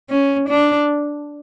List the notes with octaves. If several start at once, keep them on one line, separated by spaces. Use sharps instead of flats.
C#4
D4